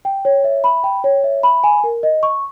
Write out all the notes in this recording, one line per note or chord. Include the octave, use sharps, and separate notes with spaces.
G5
C#5
E5
B5
G5
C#5
E5
B5
G#5
A#4
D#5
C#6